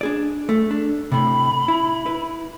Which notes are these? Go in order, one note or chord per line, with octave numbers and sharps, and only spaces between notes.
D4 G#4 D5
A3
D4
A2 C3 B5
E4
E4 B4